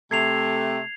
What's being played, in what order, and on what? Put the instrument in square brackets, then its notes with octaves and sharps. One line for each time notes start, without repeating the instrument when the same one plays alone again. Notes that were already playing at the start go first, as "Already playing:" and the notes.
[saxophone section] C3 A3 [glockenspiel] G#6 C7 F7